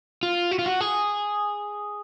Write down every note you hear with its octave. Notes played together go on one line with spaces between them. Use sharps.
F4
F#4
F4
F#4
G#4